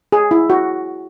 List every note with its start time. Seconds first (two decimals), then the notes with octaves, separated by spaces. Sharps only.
0.12 G#4
0.31 E4
0.50 F#4